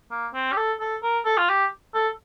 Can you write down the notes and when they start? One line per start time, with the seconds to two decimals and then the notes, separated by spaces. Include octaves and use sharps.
0.11 A#3
0.34 C4
0.52 G4
0.57 A4
0.80 A4
1.03 A#4
1.26 A4
1.38 F4
1.50 G4
1.95 A4